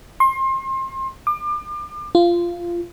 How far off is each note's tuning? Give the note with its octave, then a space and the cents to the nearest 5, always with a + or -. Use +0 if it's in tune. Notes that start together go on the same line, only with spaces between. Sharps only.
C6 +30
D6 +35
F4 -15